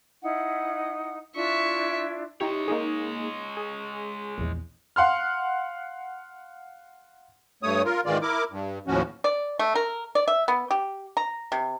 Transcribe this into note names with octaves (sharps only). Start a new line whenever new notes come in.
D#4 E4 F#5
D4 E4 F4 E5 C#6
G#3 D#4 E4 G4 C#5
A#3 D#4 G#4
G#4
A#1 E2
F5 F#5 C6 F6
G2 A3 C#5 D#6
F4 A#4
G#2 D#3 E3 G#3 F4 D5
E4 A#4 D6
G2
D#2 A2 F3 C#4 F#4
D5
A3
A#4
D5
E5
B3
G4
A#5
C3